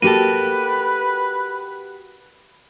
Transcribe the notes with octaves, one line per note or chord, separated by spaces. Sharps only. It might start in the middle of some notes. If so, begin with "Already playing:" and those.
A#3 F#4 G4 A4 B4 D#7